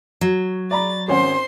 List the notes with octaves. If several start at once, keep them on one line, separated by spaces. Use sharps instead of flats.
F#3
D5 A#5 B5 A6
G#1 C#4 C5 F#5 C6